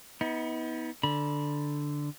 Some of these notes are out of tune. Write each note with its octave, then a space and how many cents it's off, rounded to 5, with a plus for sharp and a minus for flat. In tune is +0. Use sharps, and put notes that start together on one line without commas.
B3 +0 D#4 +45
D3 +0 B5 -25